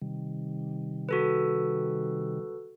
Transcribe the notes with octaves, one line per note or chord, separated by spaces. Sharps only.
C3 D#3 G3
F#4 A4 B4